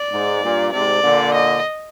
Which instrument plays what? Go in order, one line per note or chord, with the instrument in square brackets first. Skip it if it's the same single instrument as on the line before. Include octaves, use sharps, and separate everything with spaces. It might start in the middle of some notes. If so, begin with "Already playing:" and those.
Already playing: [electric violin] D5
[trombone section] G#2
G2 A#2
[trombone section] G#2 C3 [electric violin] D5
[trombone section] A#2 D3
[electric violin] D#5